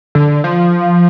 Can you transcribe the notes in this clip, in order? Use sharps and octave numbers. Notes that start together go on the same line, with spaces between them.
D3
F3